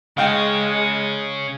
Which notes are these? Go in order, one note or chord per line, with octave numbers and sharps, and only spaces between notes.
C#3 G#3 D#5 F5 G5